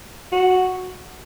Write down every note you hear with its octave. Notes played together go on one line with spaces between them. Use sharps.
F#4